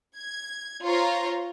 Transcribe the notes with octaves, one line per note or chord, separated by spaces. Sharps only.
G#6
F4 C5 C#5 A#5